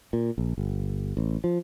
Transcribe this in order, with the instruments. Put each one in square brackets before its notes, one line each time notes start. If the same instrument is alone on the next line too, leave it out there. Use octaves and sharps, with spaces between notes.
[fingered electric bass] A#2
A#1
G1
A1
F3